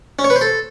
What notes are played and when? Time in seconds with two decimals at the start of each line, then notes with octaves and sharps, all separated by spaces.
0.19 C#4
0.24 C#5
0.30 B4
0.36 C5
0.41 A4